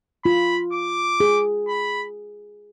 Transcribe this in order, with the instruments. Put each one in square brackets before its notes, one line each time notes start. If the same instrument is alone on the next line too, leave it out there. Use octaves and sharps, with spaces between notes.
[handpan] F4 [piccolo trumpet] B5
[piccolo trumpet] D6
[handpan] G#4
[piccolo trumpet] B5